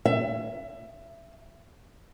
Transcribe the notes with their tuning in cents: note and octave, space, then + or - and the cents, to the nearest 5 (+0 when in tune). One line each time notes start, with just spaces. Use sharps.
E5 +25